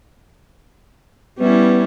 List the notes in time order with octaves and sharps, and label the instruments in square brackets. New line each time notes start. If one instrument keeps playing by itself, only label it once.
[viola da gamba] G3 C#4 E4 [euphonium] B3